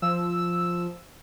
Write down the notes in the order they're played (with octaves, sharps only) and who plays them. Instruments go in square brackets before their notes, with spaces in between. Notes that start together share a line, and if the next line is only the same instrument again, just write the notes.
[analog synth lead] F3 [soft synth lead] E6